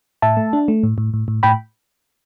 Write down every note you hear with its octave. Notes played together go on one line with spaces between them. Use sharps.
A2 E5 A5
A3
D4
A3
A2
A2
A2
A2
A2 G5 B5